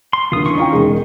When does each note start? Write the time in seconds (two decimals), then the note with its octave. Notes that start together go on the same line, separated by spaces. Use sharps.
0.13 C6
0.32 D#1 D2 F4 D#6
0.46 D#3 E3 C#4 C#6
0.57 D#4 F4 G5
0.73 E1 G#3